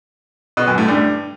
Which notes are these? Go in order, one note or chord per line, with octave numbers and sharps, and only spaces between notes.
B2
F#2
A2
G2